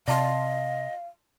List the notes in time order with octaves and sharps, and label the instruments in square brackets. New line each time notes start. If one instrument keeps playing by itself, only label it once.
[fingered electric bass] C3 [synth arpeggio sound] D5 A5 C6 [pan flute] D#5 [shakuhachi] F5